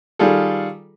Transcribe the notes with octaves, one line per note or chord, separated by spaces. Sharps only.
D#3 G3 F4 G#4 A4